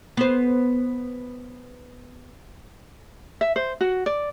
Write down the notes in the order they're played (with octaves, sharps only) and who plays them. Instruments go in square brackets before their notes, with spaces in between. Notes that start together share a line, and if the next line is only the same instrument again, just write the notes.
[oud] B3 C5
[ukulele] E5
C5
F#4
D5